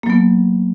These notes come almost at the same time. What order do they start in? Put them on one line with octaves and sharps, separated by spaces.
A#3 F#3 B3